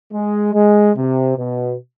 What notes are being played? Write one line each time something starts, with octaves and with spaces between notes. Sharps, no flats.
G#3
G#3
C3
B2